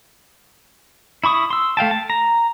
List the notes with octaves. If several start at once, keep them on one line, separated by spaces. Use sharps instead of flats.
E4 B5 C#6 D#6
C6 E6
A3 F5 G5 A5
A5
A#5